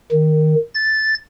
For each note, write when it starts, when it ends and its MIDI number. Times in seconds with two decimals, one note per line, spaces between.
0.12 0.55 51
0.75 1.15 93